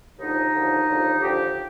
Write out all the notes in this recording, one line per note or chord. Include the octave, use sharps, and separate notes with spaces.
D#2 D3 F3 D#4
D#2 D3 F3
D#2 D3 F3
D#2 D3 F3 G4